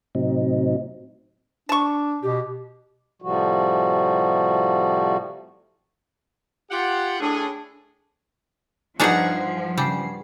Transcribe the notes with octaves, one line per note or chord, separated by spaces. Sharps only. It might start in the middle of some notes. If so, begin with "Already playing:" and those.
A2 C3 F#3 C4 D#4
D4 A5 C#6
B2 G4
A2 C3 F3 G3 F#4
F4 G4 F#5
A2 D4 G#4
G2 F3 D4 D#4 F#4 G#4 F#5 G#5
C#3 G3 G#5 C7